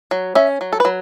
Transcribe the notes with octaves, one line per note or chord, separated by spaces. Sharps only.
F#3
C#4 E5
F#3
A4
B4
F#3